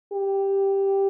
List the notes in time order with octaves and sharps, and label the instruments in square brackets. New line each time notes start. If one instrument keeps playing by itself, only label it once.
[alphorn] G4